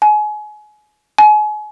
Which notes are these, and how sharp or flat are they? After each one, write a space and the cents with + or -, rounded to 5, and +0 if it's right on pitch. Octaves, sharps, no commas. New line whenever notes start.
G#5 +30
G#5 +35